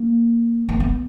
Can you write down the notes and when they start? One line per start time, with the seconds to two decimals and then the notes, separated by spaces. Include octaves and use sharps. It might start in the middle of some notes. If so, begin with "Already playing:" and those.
Already playing: A#3
0.69 A#3
0.80 B3